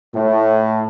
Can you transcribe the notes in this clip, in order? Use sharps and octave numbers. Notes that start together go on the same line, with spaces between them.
A2